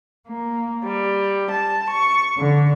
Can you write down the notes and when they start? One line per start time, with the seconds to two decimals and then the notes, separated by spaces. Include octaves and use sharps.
0.27 A#3
0.85 G3
1.50 A5
1.89 C#6
2.37 D3